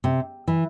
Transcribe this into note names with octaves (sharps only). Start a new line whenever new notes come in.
C3
E3